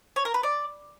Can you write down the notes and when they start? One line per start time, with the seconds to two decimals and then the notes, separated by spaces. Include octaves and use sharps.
0.16 C#5
0.25 A#4
0.34 B4
0.43 D5